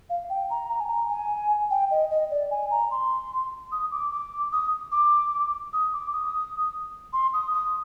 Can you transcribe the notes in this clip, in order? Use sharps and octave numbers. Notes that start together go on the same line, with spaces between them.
F5
G5
A#5
A#5
G#5
A#5
G#5
G5
D#5
D#5
D5
G#5
A#5
C6
D#6
D6
D6
D#6
D6
D#6
D6
D#6
C6
D#6
D#6